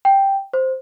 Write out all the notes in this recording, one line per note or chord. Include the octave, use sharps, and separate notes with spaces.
G5
C5